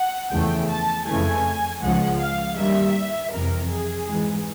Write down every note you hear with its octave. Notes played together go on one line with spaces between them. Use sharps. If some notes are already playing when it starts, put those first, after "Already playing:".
Already playing: F#5
E2 C#3 F3 A3 G5
A5
F2 C#3 E3 A3 G#5
C#2 C#3 F3 G#3 F#5
F5
G2 D#3 G3 A#3 E5
F2 C3 E3 A#4
G#4
G#2 E3 G#3